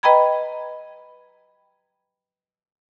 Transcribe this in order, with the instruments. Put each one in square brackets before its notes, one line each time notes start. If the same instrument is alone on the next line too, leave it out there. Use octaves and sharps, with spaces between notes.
[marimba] B4 D#5 G5 A#5 B5 G#6